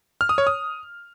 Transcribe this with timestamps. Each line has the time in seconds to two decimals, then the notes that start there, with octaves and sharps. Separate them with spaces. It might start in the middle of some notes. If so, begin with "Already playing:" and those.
0.21 F6
0.29 D#6
0.38 C#5
0.47 D#6